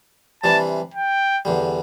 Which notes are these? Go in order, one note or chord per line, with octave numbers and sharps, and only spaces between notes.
C3 E3 G3 D4 A5
G5
E2 D3 G3